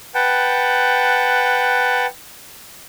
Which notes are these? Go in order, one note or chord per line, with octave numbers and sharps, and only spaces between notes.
B4 F#5 G5 A5